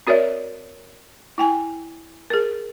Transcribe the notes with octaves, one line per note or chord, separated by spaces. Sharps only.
C4 F#4 A#4 C#5 D5 E5
E4 G5 G#5
G#4 A#4